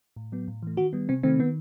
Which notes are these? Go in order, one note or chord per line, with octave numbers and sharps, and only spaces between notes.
A2
F#3 B3
A2
E3 A3
D#3 F#4
G3 B3
C3 C4
D#3 A3 C4
D#3 B3